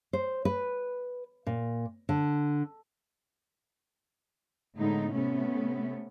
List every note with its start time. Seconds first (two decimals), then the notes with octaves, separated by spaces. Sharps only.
0.13 C5
0.45 B4
1.47 A#2
2.09 D3
4.76 A2 D3 G#3 B3 D#4
5.12 C3 A3 B3 C#4